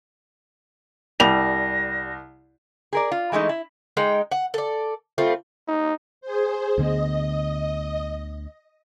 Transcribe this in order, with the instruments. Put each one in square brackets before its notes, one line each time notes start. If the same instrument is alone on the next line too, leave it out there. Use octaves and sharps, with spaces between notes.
[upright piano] C2 F7 [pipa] G3 [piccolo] A#6
[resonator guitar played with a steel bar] G#4 A#4 D5
F4
E3 G#3 A3 D#4
E4
[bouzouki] G#3 D#4 G5
F#5
A4 D5
G3 A3 C4 F4
[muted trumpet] D#4
[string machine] G#4 C5
[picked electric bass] D2 D3 B3 [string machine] D#5